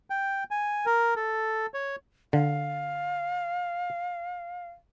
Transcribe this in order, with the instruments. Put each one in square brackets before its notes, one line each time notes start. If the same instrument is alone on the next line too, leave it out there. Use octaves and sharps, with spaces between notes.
[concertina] G5
G#5
A#4
A4
C#5
[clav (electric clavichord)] D3 [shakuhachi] F5